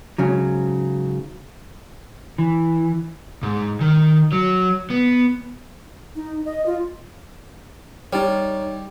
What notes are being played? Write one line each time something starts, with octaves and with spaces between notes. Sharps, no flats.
G#2 C#3 F#3
E3
G#2
D#3
F#3
B3
D#4
D#5
F4
G3 D#4 C#5